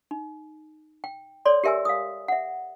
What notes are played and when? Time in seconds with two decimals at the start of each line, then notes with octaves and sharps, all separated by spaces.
0.11 D#4
1.04 G5
1.45 A4 C#5 D5 C6
1.64 G4 A#4 E5 G#5 E6
1.85 F5 D#6
2.28 E5 F#5